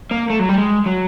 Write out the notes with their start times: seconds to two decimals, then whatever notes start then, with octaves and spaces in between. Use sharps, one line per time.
0.11 A#3
0.30 A3
0.39 F#3
0.49 G3
0.58 G#3
0.86 F#3